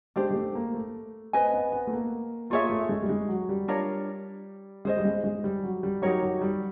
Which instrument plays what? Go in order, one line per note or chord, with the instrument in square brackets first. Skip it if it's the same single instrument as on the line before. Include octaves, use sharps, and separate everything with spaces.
[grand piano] G#3 [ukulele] D4 G4 C5
[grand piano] G#3
A3
A#3
A3
[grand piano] C4 [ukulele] B4 D#5 G#5
[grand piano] B3
B3
A3
A#3
[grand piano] A#3 [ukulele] F4 G#4 C#5 E5
[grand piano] A3
G#3
G3
G#3
F#3
G3
[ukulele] D4 F4 A#4 C#5
[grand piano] G#3 [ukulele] G#4 C5 D#5
[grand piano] G3
G#3
G#3
G3
F#3
G3
[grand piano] F#3 [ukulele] D#4 G4 A#4 C#5
[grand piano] F#3
G3